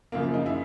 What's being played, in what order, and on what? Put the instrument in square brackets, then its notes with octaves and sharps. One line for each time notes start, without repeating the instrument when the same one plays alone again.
[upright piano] F#2 C#3 F3 A#3
D#4
E4